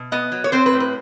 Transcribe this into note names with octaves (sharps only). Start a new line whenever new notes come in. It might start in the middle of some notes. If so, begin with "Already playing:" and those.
Already playing: B2
B3 D#5
F#3
C#5
C4 C5
B4
A2
B4